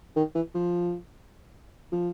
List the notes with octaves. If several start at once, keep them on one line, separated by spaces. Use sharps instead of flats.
D#3
E3
F3
F3